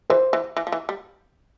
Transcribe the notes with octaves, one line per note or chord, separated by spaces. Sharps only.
E3 C5
E3
E3
F3
E3
G3